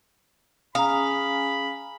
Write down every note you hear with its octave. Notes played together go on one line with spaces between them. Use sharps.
C#4 G#4 F5 G#5 A#5 B5 D#6